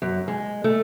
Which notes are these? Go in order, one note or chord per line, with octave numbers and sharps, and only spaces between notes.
F#2
G#3
A3